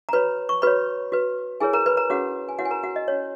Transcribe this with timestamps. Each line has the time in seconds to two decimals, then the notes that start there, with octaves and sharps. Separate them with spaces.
0.09 A#5
0.13 F#4 B4 C#5 B5
0.49 C#6
0.62 F#4 B4 C#5 B5
1.12 F#4 B4
1.60 E4 G#4 A#4 C#5 G#5
1.73 A#4 A#5
1.86 B4 B5
1.97 A#4 A#5
2.09 C#4 F#4 G#4 C#5 F#5
2.49 G#5
2.59 E4 F#4 A#4 C#5 F#5
2.65 G#5
2.71 A#4 A#5
2.83 F#4 F#5
2.96 D#5
3.08 C#4 F#4 C#5